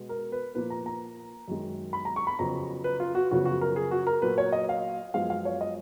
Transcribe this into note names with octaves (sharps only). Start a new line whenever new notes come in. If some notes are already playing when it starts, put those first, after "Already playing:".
Already playing: B2 G#3 B3
A#4
B4
A#2 F3 A#3 B4
A#5
A#5
F#2 D#3 G#3
B5
A#5
C#6
B5
F2 C#3 F#3 B3 A#5
B4
F4
F#4
F#2 C#3 F3 B3 F#4
F#4
A#4
G#4
F#4
A#4
A#2 F#3 A#3 B4
C#5
D#5
F5
F#2 F3 G#3 B3 F5
F5
C#5
D#5